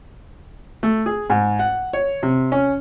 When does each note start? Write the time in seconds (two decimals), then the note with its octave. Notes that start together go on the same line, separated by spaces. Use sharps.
0.83 A3
1.06 G#4
1.30 G#2
1.59 F#5
1.93 C#5
2.23 C3
2.52 C#4